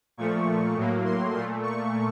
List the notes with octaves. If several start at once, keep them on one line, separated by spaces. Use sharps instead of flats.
A#2 F3 A3 C#6
A2 F#3 A#3
C6
A#2 A3 C6
C#6